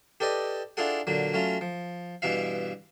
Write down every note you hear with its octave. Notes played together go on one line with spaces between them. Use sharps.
G4 A4 B4 D5 D#5
D4 E4 F4 G#4 A4 F#5
A#2 D3 F#3
F#3 A3 C#4 F4
F3
G2 B2 E3 E4 E5 F5